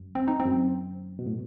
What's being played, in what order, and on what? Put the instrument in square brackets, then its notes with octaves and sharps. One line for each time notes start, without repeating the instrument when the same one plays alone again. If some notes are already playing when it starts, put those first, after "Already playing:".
Already playing: [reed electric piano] F#2
[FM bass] C4
D#4
C4
[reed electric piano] F#2
B2
A2